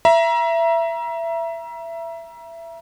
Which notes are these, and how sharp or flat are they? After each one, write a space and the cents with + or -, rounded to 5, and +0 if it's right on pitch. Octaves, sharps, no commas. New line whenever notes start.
E5 +20 A#5 +30